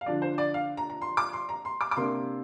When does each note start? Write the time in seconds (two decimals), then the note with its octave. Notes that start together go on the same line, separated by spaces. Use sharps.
0.01 F5
0.06 D3 F3 D4 D5
0.22 C5
0.38 D5
0.54 F5
0.77 A#5
0.90 A#5
1.02 C6
1.17 D6
1.33 C6
1.49 A#5
1.65 C6
1.81 D6
1.91 D6
1.97 C3 A#3 D4 C6